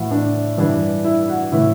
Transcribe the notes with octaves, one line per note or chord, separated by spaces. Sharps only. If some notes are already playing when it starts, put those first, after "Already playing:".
Already playing: A2 E3 F#4
D4
G2 E3 D4
E4
F#4
A2 E3 E4